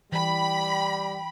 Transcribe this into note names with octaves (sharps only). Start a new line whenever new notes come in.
E3 G3 G5 B5